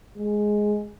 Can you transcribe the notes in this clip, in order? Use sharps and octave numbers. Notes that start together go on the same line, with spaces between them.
G#3